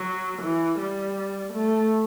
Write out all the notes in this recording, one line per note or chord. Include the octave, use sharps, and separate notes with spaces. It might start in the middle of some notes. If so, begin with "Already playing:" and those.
Already playing: F#3
E3
G3
A3